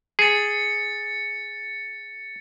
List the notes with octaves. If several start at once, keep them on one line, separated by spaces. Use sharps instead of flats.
G#4 A6 C#7